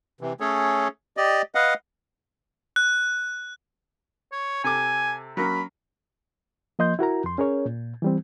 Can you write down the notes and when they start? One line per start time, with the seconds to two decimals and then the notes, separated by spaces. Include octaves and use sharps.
0.21 C3 E3
0.40 A3 C#4 G#4 A4 C#5
1.17 G4 D5 D#5
1.55 B4 D#5 F5 F#5
2.76 F#6
4.32 C#5
4.64 C3 A4 G#5 D6
5.37 F#3 A#3 C#4 B5
6.79 F3 A#3 D#5 C6 G6
6.99 E4 F#4 A#4 A#5
7.24 F2 C6
7.38 C#4 G#4 A#4 C#5
7.66 A#2
8.02 E3 G3 C4